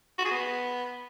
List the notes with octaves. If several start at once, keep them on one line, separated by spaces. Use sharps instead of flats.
F#4
G#4
B3